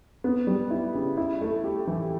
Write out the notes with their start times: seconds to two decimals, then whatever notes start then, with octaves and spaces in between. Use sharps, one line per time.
0.24 B3
0.47 G3
0.70 E4
0.95 C#3
1.17 E4
1.42 A3
1.64 G4
1.87 E3